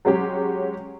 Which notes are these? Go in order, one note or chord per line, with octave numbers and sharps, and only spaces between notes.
F#3 G#3 C#4 G4